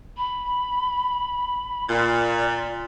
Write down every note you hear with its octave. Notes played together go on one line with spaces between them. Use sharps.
B5
A#2 D5